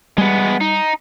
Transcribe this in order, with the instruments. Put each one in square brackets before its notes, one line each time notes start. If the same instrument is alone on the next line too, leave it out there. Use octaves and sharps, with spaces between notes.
[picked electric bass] G3 [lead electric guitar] G#3 B3
[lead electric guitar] D#4